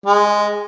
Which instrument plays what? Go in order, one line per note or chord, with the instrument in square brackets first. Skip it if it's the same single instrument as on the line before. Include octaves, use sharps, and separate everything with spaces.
[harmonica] G#3